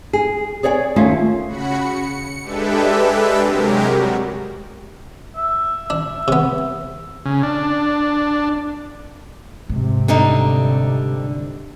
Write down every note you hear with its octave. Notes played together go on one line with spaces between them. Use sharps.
G#4
G#4 C#5 D5 F#5 G#5
D#2 A3 C#4 F4 E5 G#5
C#3 F#4 B5 C#7
C#7
G#3 D4 G4 A4 B4 E5
C3 F#3 G#3 G4 A#4
G3 F#4
E5
D4
C3 B3
C#3
D4
G#2 C3
D3 G3 D#4